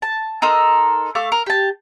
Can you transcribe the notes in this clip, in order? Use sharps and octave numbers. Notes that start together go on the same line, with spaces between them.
A5
D#4 A4 A#4 C6
A3 F5 D6
A#4
G4 A5